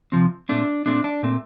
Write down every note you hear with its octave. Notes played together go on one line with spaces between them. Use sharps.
C3 F3 C4
A#2 A3 C4 D4
A#2 A3 C4 D4
D4
A#2 A3 C4